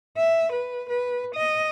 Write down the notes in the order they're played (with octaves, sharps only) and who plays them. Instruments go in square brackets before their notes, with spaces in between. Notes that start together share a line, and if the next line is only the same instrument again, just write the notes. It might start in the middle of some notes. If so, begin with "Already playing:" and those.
[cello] E5
B4
B4
D#5